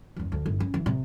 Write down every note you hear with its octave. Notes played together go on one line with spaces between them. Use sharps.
F#1 E2
D2
G1
C#4
E3
C3